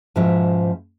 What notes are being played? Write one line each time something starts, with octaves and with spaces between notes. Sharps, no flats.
G#2 B2 F3 C#4 E4